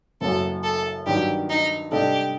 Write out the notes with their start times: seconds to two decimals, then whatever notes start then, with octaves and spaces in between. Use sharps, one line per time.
0.21 F#1 F#2 F#3 A4
0.63 A4
1.06 G2 D#3 F#3 G4
1.50 D#4
1.92 C3 G3 D4 G4 A4 D#5